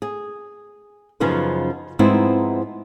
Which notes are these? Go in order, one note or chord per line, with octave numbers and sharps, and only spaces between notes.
G#4
F#2 C#3 F3 B3 D#4 B4
G#2 F3 B3 C4 D#4 E4